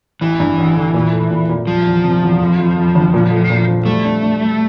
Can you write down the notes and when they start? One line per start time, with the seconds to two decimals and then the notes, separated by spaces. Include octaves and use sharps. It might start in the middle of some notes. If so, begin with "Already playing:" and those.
0.21 A1 E3
0.40 G2
0.58 A1
0.76 D3
0.94 A#2
1.12 A3
1.31 A#2
1.49 A#2
1.67 F3 G3
1.86 E2
2.04 C3
2.22 E2
2.40 F2
2.58 F2
2.77 F2
2.95 G1
3.14 A#2
3.31 A3
3.50 A#2
3.68 F3
3.86 G3 A3
4.05 D4
4.22 D4
4.41 G3